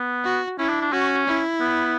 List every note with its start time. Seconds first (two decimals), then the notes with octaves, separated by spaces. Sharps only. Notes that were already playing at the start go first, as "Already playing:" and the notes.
Already playing: B3
0.24 F#4
0.59 C#4 E4
0.70 D4
0.82 D4
0.92 C#4 F#4
1.27 E4
1.61 B3